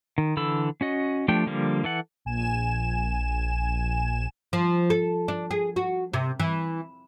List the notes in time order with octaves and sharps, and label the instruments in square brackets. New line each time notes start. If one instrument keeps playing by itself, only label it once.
[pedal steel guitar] D#3
D3 E3 A4 B5 E6
C#4 F#4 D#5
F3 A3 D4 G4 G5
D3 F3 G3 A#3
E3 A4 F#5
[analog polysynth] A#1 G#5 E7
[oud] F3
A4
D4
G#4
F#4
C3
E3